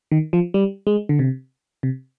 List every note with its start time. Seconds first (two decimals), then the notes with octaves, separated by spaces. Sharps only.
0.11 D#3
0.33 F3
0.54 G3
0.87 G#3
1.09 D3
1.19 C3
1.83 C3